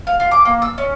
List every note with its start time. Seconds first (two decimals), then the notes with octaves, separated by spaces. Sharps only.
0.07 F5
0.20 F4
0.31 D6
0.45 A#3
0.62 E6
0.78 C#4